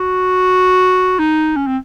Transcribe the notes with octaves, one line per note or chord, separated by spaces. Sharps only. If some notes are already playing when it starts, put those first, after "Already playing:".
Already playing: F#4
D#4
C#4
C4